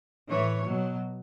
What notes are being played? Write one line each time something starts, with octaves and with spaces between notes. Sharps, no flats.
A2 E3 C#5
B2 F#3